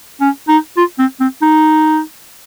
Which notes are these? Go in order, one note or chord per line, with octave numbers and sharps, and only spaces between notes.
C#4
D#4
F4
C4
C4
D#4